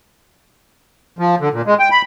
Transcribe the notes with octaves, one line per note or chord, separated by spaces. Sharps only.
F3
D3
A#2
G#3
G5
B5